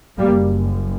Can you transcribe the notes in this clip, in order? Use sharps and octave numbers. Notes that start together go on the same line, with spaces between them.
F#1 F#2 G3 A#3